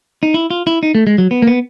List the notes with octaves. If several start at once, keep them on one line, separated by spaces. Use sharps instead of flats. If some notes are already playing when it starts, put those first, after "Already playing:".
D#4
E4
F4
E4
D#4
A3
G#3
F#3
B3
A#3
B3